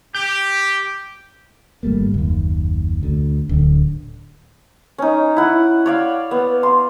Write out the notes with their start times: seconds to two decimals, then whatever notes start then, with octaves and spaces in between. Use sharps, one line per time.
0.15 G4 G6
1.83 G#1 G3 A3 A#3
2.14 F#1 D#2
3.03 D2 D3
3.49 D1 D3
4.98 C#4 D#4
5.37 E4 F#5
5.86 C#5 D5 F5
6.31 B3
6.63 C6